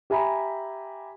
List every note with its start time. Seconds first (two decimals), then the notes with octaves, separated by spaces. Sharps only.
0.10 G4 E5 G#5 A#5 B5